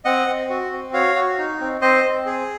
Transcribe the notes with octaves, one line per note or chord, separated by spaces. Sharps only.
C4 D#5 F#5
C4
F#4
C4
F#4 C#5 F5
F#4
D#4
C4
C4 C5 D#5
C4
G#4